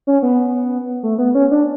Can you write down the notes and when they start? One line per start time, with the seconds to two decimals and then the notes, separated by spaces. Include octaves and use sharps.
0.07 C#4
0.23 B3
1.03 A3
1.18 B3
1.35 C#4
1.51 D4